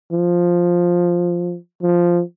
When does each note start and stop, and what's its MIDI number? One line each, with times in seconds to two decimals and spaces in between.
0.12 1.57 53
1.83 2.22 53